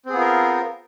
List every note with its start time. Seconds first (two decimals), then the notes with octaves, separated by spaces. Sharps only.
0.06 C4
0.09 G#4
0.13 B3
0.17 F4
0.20 A#4